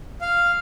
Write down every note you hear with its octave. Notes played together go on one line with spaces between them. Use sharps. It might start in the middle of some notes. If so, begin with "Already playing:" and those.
F5